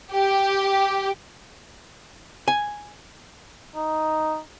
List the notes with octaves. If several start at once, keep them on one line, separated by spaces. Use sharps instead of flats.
G4
G#5
D#4